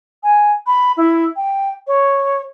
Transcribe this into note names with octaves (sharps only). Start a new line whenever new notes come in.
G#5
B5
E4
G5
C#5